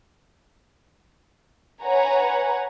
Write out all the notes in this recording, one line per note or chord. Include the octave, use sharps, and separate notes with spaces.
B4 C#5 F#5 G#5 A#5